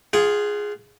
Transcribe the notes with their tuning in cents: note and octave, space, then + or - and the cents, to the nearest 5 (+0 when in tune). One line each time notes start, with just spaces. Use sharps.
F4 +0 G#4 +0 F#5 +40